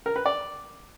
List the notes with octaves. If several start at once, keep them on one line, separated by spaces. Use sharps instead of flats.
A#4
B4
D5